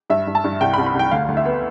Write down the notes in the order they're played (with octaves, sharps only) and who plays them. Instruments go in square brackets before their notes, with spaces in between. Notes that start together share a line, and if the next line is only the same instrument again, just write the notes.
[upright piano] G2 E5
G2
A5
G2
C2 G5
B5
C2
B5
C2 G5
D2 F5
D2
E5
B3